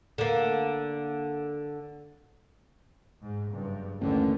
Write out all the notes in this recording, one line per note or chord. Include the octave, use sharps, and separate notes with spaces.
D3 A#3
G#2
F#1 G2
A1 D#2 D3 C#4